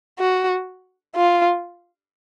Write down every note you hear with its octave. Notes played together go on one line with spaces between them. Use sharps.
F#4
F4